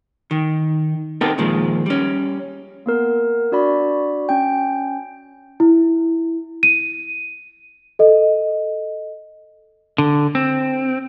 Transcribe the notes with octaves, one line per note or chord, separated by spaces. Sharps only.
D#3
B3 C4 D#4 G4 A4 A#4
A#2 D#3 F3 G#3
G3 C#4
A#3 B3 A#4
D4 F#4 D5 B5
C#4 G5
E4
D#7
A4 D#5
D3
C4